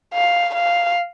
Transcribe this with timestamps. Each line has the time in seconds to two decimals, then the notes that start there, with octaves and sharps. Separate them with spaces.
0.14 F5
0.54 F5